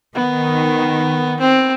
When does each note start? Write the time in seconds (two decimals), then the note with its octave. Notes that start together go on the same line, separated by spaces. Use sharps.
0.15 D#3 B3
1.40 C4